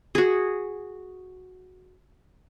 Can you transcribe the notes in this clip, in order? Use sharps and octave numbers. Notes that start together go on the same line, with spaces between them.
F#4 G#4